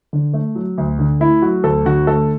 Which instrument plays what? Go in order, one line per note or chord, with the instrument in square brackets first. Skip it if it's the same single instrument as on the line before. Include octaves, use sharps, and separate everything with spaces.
[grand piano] D3
A3
F#3
D2
D3
A3 E4
F#3 F#4
D2 A4
D3 F#4
A3 A4